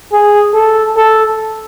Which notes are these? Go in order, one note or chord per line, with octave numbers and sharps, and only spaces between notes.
G#4
A4
A4